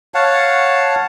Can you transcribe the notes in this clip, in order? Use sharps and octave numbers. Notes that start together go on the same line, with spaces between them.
C#5 F5 F#5 A5